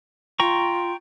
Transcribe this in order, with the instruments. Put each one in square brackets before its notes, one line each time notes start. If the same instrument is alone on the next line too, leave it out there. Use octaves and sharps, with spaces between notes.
[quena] F4 [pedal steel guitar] G5 A#5 C#6